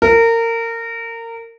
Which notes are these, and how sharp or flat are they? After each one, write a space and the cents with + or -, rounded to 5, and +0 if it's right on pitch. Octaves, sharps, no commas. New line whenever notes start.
A#4 -25